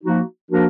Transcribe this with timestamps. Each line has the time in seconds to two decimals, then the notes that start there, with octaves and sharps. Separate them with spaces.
0.03 F3 A#3 D#4 F#4
0.50 F3 A#3 D4 F#4 A#4